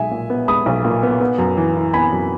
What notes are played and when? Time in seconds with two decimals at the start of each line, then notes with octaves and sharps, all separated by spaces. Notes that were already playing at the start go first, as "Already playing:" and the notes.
Already playing: B1 G#3 E5 G#5
0.11 A#2
0.30 B3
0.48 G#3 B5 D#6
0.66 B1
0.85 A#2
1.03 B3
1.20 B3
1.39 F#2
1.57 E3
1.76 E4
1.93 B3 G#5 B5
2.13 F#2